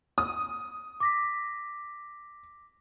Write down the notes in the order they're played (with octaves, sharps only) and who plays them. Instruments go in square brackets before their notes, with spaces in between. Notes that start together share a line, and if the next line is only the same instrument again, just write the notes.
[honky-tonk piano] D#6
[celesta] D6 A#6 B6